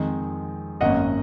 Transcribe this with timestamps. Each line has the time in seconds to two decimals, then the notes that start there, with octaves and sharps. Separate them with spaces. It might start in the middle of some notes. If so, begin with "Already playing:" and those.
Already playing: F2 D#3 G#3
0.81 G#1 F#2 D#3 A#3 C#4 D#5 F#5